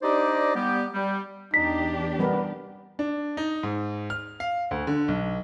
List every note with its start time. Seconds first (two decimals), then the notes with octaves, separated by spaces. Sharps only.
0.02 D4 D#4 G4 C5 D5 D#5
0.56 G3 B3 G4
0.94 G3
1.54 E2 D4 D#4 G4 B6
2.19 G3 B3 A#4 B4
2.99 D4
3.37 D#4
3.63 G#2
4.10 F6
4.40 F5
4.71 D2
4.87 D3
5.08 B1